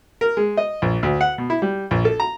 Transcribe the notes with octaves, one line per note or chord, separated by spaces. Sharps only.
A#4
G#3
D#5
A#1
D2
F#5
B2
E4
G3
A#1
A4
A#5